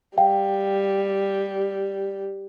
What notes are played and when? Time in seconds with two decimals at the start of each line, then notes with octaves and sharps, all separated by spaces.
0.18 G3 F5 G5